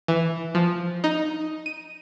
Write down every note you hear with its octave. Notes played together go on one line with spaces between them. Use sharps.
E3
F3
D#4
D#7